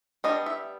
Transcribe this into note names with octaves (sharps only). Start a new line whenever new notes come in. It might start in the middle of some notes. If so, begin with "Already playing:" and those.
G3 B3 D4 D#5
E5